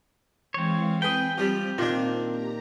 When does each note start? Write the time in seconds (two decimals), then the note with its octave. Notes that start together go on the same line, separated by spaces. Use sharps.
0.54 E3 G#3 C4 C#5 F5
1.02 C4 G#4 B4 G5
1.38 F3 G3
1.78 A#2 D#3 A#3 D4
2.28 G4 A#5